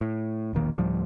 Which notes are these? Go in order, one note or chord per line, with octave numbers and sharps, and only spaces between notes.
A2
E1 A#1 D#3 A#3
D2 A2 F3 G3